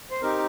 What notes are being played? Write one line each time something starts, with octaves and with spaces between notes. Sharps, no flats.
C5
C4 D#4 G4 A#4